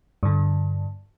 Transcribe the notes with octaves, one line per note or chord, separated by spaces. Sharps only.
G2 D3